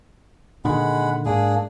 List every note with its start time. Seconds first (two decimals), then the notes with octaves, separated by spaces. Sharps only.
0.65 A#2 D3 D#3 G#3 F#5 B5
1.26 G#2 A#3 D4 G#4